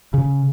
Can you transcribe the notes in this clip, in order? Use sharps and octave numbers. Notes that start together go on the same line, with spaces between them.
C#3